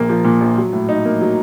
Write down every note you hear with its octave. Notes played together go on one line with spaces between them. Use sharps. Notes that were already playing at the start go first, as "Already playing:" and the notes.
Already playing: A#1 A#2 A#3
F3
A#2
A#1
F#3
A2
D#4
A#3
F#3